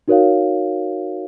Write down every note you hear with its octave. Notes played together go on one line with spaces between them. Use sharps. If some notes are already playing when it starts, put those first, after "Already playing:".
D#4 F#4 A#4 C#5 F5